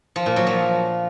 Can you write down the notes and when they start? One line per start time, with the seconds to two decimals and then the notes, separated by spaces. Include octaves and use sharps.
0.16 F3
0.26 A#2
0.36 F#3
0.47 F3